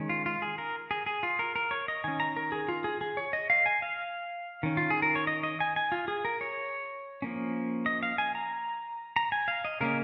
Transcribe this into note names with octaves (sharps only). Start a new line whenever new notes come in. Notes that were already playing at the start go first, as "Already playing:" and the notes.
Already playing: D#3 G#3 C#4
F4
F4
G#4
A#4
G#4
G#4
F4
A#4
A#4
C#5
D#5
D#3 C#4 G#5
A#5
A#4
G#4
F4
G#4
G#4
C#5
D#5
F5
G#5
F5
D#3 C#4
F4
G#4
A#4
C#5
D#5
D#5
G#5
G#5
F4
G#4
A#4
C#5
F3 A#3 C#4
D#5
F5
G#5
A#5
A#5
G#5
F5
D#5
C#3 A#3 C#4 A#4